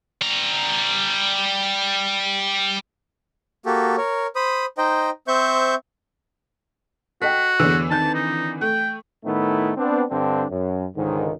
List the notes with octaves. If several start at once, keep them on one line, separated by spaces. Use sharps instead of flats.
G3 A#5
A#3 F#4 G4 A4
A#4 C#5
C5 B5 D#6
D#4 C5 D#5 G5
C4 C5 E5 C#6 G6
F#4 A4 D#5 G5 B6
E2 D3 E3 C#5 E6
D#3 C4 A5 G6
D#4
A3 G5
A2 D#3 A3 B3 D#4 E4
B3 C4 D4
G2 D3 C4 D4
F#2
C#2 G#2 D3 D#3